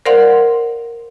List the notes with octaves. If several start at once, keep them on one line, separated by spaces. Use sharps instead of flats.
A#4 C5 D5 F5 F#5 C6